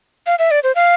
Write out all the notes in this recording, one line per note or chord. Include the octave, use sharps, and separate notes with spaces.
F5
E5
D5
C5
F5